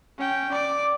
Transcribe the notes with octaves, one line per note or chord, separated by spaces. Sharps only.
C#4 G5
D5 D6